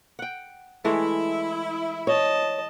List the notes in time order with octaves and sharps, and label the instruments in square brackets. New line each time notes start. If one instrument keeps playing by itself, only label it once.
[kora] F#5 G5
[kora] E3 G#3 A3 [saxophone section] E4
[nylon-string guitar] C#5 [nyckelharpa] D#5 A5